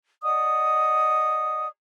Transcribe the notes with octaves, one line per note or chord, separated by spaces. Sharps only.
D5 D#5 F#5 D#6